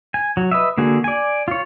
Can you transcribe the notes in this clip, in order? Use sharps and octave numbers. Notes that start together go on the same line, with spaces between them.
G#5
F#3
B4 D#5 E5
D3 A#3 F#4 G#4
D5 G#5
F4 C#5